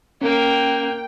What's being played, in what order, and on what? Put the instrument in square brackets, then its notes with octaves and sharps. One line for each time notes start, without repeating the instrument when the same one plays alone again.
[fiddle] A#3 [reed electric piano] C#4 [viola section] G5